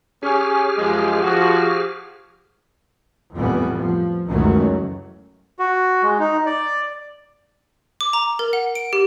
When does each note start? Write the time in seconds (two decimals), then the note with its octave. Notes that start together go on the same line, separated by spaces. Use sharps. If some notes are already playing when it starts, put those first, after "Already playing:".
0.23 C#4 G4 G#4 F6
0.77 F#2 F3 G#3
1.22 F3 F#4
3.34 F2 A2 E3 G3 B3
3.76 F3
4.28 C#2 F#2 D#3 E3 F#3 A3
5.59 F#4
6.03 G#3
6.19 D#4
6.46 D5
8.01 D6
8.13 A#5
8.39 A#4
8.53 F#5
8.75 D7
8.93 G4